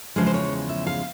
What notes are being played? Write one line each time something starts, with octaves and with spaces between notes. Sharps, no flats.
E2 C#3 F3 G#3 C5
C5
C#5
E5
F5